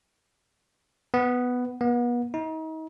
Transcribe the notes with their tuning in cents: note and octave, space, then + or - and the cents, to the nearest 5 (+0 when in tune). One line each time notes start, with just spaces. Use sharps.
B3 +5
B3 -35
D#4 +35